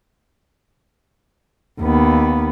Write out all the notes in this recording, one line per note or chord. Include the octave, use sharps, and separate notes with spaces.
D#2 B3